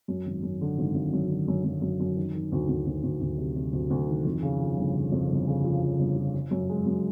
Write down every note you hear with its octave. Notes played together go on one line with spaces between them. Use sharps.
F#2
G#1
F#2
D3
G#1
G#1
F#2
D3
F#2
F#2
F#2
F#2
D#3
D#3
D2
D2
D2
D2
D2
C3
C3
D2
D2
D#3
F2
C#3
F3
G1
C#3
F2
G1
C#3
F3
F3
G1
F3
F3
F#2
G#3
F#2